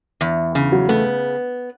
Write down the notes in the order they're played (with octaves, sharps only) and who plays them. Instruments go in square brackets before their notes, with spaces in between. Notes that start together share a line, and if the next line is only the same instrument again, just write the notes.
[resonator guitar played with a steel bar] E2
C#3
[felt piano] F#3
[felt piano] A3 [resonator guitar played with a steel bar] B3